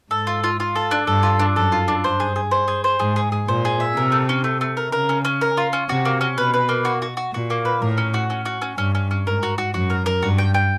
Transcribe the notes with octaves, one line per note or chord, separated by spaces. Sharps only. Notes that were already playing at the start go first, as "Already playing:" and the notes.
G#2 A4
F4
F4
F4
A4
D4
G2 A4
F4
D4
F#2 A4
F4
D4
G2 C5
G#4
G#4
C5
G#4
C5
G#2 G#4
G#4
G#4
A#2 C5
G#4
E5
C3 A#4
A3
C#4
A3
A3
A#4
C#3 A#4
C#4
C#4
A#4
F4
C#4
C3 F#4
A#3
C#4
B2 B4
B4
A#3
F#4
F#4
F#4
A#2 F#4
A#3
B4
A2 A#4
C#4
F#4
C#4
F#4
C#4
G2 C#4
C#4
C#4
G#2 A#4
F#4
F#4
F#2 F#4
A#4
A#4
G2 F#4
G5
G5